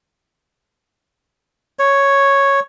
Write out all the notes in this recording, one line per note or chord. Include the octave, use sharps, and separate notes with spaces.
C#5